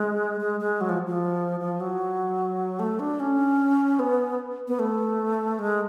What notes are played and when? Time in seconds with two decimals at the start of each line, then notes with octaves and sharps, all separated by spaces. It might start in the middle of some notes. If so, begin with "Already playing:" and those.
Already playing: G#3
0.40 G#3
0.60 G#3
0.81 F#3
0.89 F3
1.07 F3
1.60 F3
1.80 F#3
2.79 A3
3.00 D4
3.20 C#4
3.99 B3
4.68 B3
4.79 A3
5.59 G#3